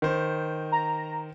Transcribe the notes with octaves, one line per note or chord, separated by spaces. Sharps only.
D#3 C5
A#5